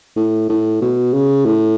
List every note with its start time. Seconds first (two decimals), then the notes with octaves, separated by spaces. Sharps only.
0.17 A2
0.49 A2
0.82 B2
1.13 C#3
1.46 A2